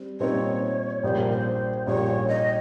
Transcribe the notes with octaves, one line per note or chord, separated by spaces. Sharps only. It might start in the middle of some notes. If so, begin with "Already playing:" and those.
Already playing: G3 C4
A#2 G3 C4 D#4 C#5
A#1 A#2 G3 C5
A#4
C5
A#1 A#2 G3 C#5
D#5